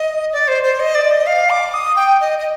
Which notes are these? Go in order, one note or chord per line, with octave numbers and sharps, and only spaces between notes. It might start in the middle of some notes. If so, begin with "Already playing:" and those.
Already playing: D#5
D5
C5
C5
D#5
D5
D#5
F5
D6
D#6
G5
D#5
D#5